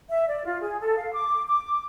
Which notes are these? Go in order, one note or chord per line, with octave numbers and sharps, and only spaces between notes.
E5
D5
F4
G#4
A4
F5
D6
D6